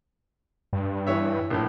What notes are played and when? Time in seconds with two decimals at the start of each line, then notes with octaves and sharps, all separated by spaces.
0.73 G2
1.07 E3 C#5 E5
1.50 A#1 A2